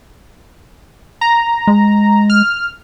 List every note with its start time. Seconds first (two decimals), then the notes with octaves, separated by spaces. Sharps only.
1.21 A#5
1.67 G#3
2.30 F6